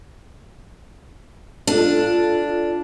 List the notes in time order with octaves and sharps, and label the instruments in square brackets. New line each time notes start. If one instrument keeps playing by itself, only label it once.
[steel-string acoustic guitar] D4 [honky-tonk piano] F4 A4